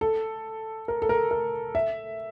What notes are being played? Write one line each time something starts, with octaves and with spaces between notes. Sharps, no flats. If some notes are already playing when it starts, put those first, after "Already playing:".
A4
A#4
A4
A#4
A#4
E5